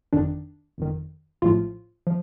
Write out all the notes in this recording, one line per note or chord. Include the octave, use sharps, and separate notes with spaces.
G1 F2 D#3 D4
G1 F2 D#3
A#1 A2 F3 F4
F3